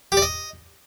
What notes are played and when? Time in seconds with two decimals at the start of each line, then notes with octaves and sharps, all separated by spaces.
0.12 G4
0.17 D5
0.22 D#5